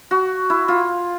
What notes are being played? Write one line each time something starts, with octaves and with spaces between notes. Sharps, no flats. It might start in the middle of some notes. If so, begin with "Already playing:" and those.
F#4
E4
F4